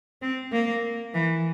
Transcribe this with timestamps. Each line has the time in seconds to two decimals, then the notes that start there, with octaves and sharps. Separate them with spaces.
0.22 C4
0.52 A#3
1.14 E3